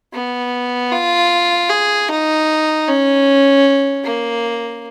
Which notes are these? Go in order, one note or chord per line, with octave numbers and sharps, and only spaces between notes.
B3
F4
G#4
D#4
C#4
A#3